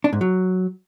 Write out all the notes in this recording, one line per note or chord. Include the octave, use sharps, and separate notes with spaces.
D4
G#2
F#3